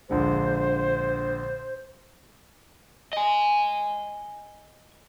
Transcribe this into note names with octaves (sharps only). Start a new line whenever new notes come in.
A#1 D3 G#3 C5
D#5 G#5